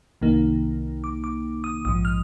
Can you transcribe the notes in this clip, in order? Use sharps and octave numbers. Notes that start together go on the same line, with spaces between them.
C2 C3 D#3 A#3 D#4
D6
D6
D#6
A#1 G#2 F3 D#6
F6